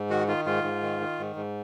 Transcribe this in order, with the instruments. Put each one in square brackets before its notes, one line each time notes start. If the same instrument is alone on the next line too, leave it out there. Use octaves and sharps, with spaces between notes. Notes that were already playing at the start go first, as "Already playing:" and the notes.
Already playing: [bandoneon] G#2
D#3 F#4
D#3 F4
G#2 F4
G#2
D#3
D#3
G#2
G#2